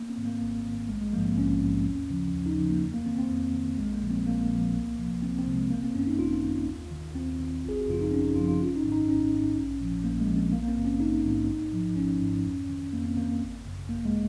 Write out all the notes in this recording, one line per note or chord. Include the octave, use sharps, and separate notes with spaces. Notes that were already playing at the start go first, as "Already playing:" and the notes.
Already playing: A#3
C4
G#2 D#3
A#3
G#1
G#2 D#3
A#1 G#3
G#3
G#2 F3 A#3
C4
A#1 C#4
G#2 F3
D#2
C#3 F3
D#2
D#4
C#3 F3
A#3
F2
A#3
D#3 C4
C4
F2
D#3
A#1 G#3
A#3
A#2 F3
C4
A#1 A#3
A#2 F3
C2
C3 F3
C2 C4
C4
C3 F3
G#3
G#1 A#3
C4
F#2 D#3 C#4
D#4
G#1 F4
F#2 D#3
D#2
D#3
D#2 C4
D#3
G#1
G#4
F#4
F#2 C#3 F3 F4
D#4
G#1 C#4
D#4
F#2 C#3 F3 F4
F4
G#1 C#4
D#4
G#2 D#3
D#4
G#1 C#4
G#2 D#3
A#1
A#2 F3
A#1 A#3
G#3
A#2 F3
C4
A#1 A#3
A#3
C4
G#2 D#3
C#4
A#1 D#4
G#2 D#3
G#1
G#2 F3
G#1 C#4
G#2 F3
F2
D#3
F2 A#3
C4
D#3 A#3
G#1
F#2 C#3
G#1 A#3
G#3